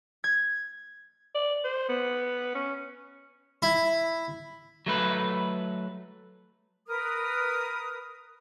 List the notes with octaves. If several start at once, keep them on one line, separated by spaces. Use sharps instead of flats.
G#6
D5
C5
B3
C#4
E4
F#3 A3 B4
A#4 B4 D#6